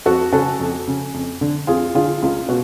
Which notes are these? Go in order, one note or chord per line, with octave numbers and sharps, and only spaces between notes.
F2 F#4 A4
C#3 F#4 A4
F2
C#3
F2
D3
F2 F4 G#4
D3 F4 G#4
C#2 F4 G#4
B2 F#4